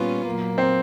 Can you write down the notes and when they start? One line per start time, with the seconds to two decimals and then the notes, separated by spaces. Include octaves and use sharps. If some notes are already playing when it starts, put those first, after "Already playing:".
Already playing: A#2 G3 B3 C#4 F4
0.26 A#2 F#3 A#3
0.58 C4